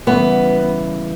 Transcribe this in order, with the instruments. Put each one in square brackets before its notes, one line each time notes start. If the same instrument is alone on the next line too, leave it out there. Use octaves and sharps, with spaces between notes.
[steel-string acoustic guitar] C#3 E3 G3 B3